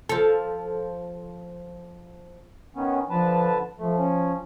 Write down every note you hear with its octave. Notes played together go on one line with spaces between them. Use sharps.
F3 A4
D#3 B3 C#4
D3 F3 B4 A5
F3 A3
C#4